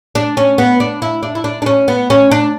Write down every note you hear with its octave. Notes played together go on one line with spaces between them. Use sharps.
D4
C#4
B3
D4
E4
D4
E4
D4
D4
C#4
B3
C#4
D4